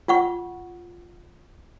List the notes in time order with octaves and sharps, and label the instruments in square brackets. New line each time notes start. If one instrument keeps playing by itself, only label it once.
[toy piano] F4 F#5 C#6